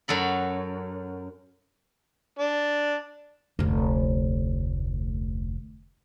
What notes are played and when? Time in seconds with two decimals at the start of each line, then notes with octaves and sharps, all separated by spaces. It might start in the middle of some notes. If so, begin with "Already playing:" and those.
0.08 F#2 F#3 A4 B5
2.39 D4
3.59 F1 D2